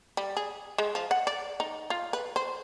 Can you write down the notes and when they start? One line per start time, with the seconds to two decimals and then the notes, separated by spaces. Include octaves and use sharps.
0.17 G3
0.37 G#4
0.78 G#3
0.95 F3
1.11 F#5
1.27 D5
1.60 D#4
1.90 F4
2.13 B4
2.36 C5